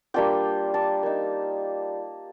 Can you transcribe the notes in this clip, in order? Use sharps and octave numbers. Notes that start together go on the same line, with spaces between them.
G3 A#3 D4 F4 G5
A5
A#3 D#4